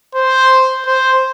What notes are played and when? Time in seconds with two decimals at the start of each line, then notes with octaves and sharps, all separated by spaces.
0.15 C5
0.86 C5